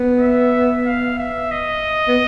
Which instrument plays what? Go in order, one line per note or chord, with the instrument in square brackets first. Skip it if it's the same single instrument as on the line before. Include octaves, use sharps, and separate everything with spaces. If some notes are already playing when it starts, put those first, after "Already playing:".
Already playing: [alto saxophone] B3
[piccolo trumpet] E5
F5
E5
D#5
[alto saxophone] B3